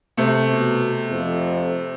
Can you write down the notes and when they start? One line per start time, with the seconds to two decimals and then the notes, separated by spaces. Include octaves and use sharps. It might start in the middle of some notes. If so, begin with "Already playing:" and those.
0.17 C3 A3
0.51 B2
1.11 F2